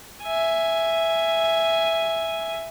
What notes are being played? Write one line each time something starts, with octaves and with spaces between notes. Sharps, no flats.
E5 G#5